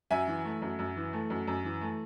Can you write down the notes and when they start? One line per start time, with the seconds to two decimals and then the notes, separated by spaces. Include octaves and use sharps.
0.10 F#2 E5 G#5
0.28 E3
0.45 A3
0.62 F#2
0.79 F#2
0.96 E3
1.13 A3
1.30 F#2
1.47 F#2
1.64 E3
1.81 A3